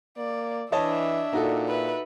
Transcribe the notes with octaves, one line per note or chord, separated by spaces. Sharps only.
A#3 D5
E3 D4 C#5 D#5 E5 A5
A#2 D#4 F#4 A4
B4 E5